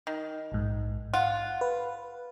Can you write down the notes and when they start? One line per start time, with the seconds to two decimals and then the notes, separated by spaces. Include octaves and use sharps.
0.07 D#3
0.52 A#1 G#2
1.14 F4 F#5
1.61 B4